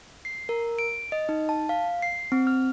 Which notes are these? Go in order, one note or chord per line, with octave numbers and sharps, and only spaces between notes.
C7
A#4
D7
D#5
D#4
A5
F5
C7
C4
F6